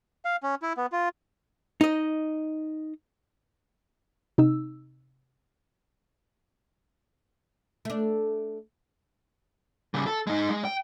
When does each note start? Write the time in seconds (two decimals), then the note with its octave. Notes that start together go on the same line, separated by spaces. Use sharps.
0.25 F5
0.43 C#4
0.62 E4
0.77 B3
0.92 F4
1.81 D#4 D#5
4.38 C3 D#4 E6
7.85 A3 D4
9.94 C#3 G3
10.07 A4
10.27 G#3 D#4
10.50 G#3
10.65 G5